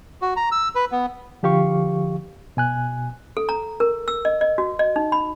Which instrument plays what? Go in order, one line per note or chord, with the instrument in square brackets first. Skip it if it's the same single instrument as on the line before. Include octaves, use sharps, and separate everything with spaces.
[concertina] F#4
A#5
E6
B4
B3
[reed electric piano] D3 F3 G4 F5 C#6
B2 G#5 F#6
[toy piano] A4
A#5
A#4
E6
D#5
D#5
F#4
D#5
D#4
B5